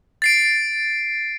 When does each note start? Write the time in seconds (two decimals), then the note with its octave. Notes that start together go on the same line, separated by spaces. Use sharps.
0.22 A6 C7 D7